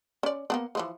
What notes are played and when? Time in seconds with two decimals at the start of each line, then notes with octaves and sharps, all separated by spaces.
0.23 C#4 D5
0.50 A#3 B3 D4
0.75 E3 F3 G#3